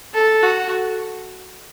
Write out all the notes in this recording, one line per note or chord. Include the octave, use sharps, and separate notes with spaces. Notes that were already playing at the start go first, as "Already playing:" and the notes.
A4
F#4